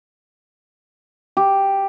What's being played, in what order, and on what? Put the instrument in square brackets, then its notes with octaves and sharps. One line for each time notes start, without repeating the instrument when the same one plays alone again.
[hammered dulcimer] G4